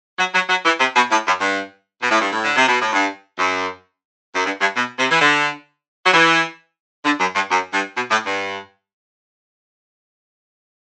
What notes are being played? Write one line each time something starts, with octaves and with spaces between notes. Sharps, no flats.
F#3
F#3
F#3
E3
C3
B2
A2
F#2
G2
B2
A2
G2
A2
D3
C3
B2
A2
G2
F#2
F#2
G2
G2
B2
C3
E3
D3
F#3
E3
D3
F#2
G2
F#2
G2
B2
A2
G2